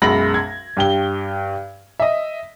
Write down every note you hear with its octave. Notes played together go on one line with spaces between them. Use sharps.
B1 F#2 G#3 B5 A#6 F#7
G#6
G2 G4 G7
D#5 E5